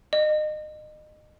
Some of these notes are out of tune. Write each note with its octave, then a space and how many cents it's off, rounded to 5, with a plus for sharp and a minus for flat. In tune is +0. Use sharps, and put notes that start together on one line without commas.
D#5 -30